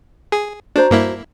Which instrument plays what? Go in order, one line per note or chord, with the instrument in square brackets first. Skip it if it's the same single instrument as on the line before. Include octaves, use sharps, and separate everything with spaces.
[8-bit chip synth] G#4
[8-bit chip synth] D4 [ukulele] F#4 C5 A#5
[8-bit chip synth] G2 A#3 E4